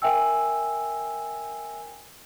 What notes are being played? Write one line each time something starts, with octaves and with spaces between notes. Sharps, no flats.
A#4 E5 G5 G#5 E6